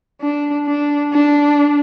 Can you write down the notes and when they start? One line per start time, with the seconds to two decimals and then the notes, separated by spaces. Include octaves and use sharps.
0.21 D4
0.67 D4
1.13 D4